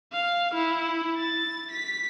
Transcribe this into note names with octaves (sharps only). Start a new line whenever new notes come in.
F5
E4
A6
B6